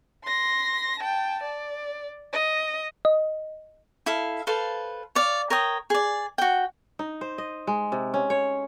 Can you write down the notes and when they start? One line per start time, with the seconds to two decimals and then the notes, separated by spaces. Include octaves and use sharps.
0.24 C6 A#6
1.00 G5 A5
1.43 D5
2.33 D#5
3.05 D#5
4.06 E4 A4 F5
4.47 A4 B4 C5 F5
5.15 C#5 D5 F5
5.50 A#4 C#5 G5 D#6
5.90 G#4 D5
6.38 F#4 G5
6.99 D#4
7.21 C5
7.38 D#5
7.67 G#3
7.92 C3
8.14 C#4
8.30 C#5